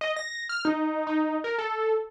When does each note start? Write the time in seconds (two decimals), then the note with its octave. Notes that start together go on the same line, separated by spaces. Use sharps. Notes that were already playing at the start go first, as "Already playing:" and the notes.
0.01 D#5
0.16 A#6
0.49 F6
0.65 D#4
1.07 D#4
1.44 A#4
1.58 A4